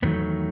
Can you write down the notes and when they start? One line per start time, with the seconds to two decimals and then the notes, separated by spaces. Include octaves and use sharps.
0.02 E2 D#3 F#3 A3 B3